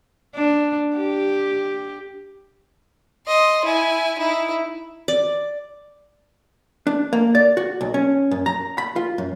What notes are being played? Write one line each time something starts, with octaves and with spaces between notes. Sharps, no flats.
D4
G4
D#5 C6
E4 G#5
D#4 E4
D5
D4
A#3
D5
F#4
B1
C#4
F#2
A#5
B5
F4
F#2